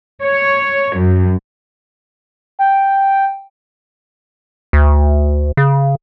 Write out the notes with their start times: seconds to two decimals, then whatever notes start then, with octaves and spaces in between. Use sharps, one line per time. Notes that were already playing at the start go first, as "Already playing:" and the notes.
0.23 C#5
0.97 F#2
2.59 G5
4.73 D2
5.57 C#3